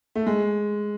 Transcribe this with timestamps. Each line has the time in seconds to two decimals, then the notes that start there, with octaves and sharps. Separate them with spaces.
0.15 A3
0.26 G#3